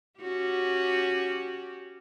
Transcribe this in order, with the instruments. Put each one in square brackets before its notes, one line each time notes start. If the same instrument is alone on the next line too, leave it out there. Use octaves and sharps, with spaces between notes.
[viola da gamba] C#4 F#4 G4